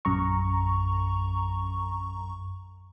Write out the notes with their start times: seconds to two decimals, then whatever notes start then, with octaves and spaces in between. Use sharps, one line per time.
0.05 A#1 F#2 A#5 C#6